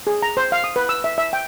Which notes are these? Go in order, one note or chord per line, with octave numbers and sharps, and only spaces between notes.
G#4
A#5
C5
F5
D#6
B4
E6
E5
E5
G5